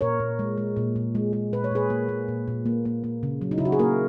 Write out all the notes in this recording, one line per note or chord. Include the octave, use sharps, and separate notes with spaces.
A#2 A#4 C#5
A#2
G#3
G#3
A#2
A#2
G#3
G#3
A#2 B4
C#5
A#2 G#4 B4
A#3
A#3
A#2
A#2
A#3
A#3
A#3
C#3
F#3
D#4
C#3 E4
F#4
G#4
A#3 F#4 A#4